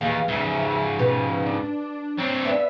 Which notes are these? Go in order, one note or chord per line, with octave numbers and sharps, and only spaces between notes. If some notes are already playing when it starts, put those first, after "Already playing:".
D#2 E3 G#4 F5
E2 G#2 C#3 G4 E5
B2 G4 B4
D4
C4 D4 C#5
B3 D5 E5 F5